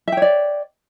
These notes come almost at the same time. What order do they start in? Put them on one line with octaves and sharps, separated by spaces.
E5 G5 C#5 D5